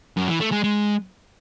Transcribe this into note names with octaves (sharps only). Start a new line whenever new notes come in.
F#2
E3
A3
G#3
G#3